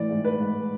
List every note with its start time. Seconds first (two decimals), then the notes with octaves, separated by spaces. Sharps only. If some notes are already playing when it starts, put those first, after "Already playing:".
Already playing: A2 E3 D5
0.10 G#2
0.24 B4
0.40 G#2